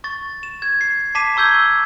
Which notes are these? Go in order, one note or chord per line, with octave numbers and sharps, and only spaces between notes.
C#6 A6
E7
G#6
C7
A5 D6 B6 C7 D#7 E7
A#5 C#6 E6 G6 G#6 G7